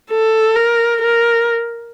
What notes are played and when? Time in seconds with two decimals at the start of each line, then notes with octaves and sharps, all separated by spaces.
0.11 A4
0.56 A#4
1.01 A#4